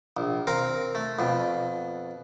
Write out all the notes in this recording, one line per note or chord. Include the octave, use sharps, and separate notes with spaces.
A#1
C4 A#4 F5
A3
F2 B2